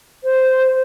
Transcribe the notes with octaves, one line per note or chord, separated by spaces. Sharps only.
C5